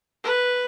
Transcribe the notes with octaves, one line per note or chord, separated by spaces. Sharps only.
B4